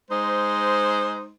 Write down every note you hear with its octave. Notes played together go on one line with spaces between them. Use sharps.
G#3 D#4 C5